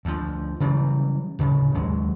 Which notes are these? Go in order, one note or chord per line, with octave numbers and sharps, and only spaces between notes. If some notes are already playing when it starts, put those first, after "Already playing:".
D2 F3
C#3 E3 F#3 G3
D1 C#3
D#2 F#3 G#3